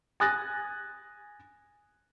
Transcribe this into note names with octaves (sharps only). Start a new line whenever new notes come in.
G#5 D#6 F#6 A6 A#6